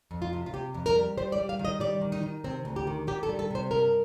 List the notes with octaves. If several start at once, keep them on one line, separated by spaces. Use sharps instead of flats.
F2
F4
C3
F4
C3 G4
F2
A#4
G3
G3 C5
D5
G3
F5
D#3
D#5
G3 D5
D#3
D#4
D#3
C3 C4
D2
G4
D#3
D#3 G4
A4
G3
A4
C3 C5
G2 A#4